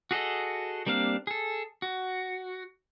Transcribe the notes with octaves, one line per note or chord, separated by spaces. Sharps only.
F#4 G#4 A4 D#5
G3 A#3 C4 D4 F5
G#4 A4
F#4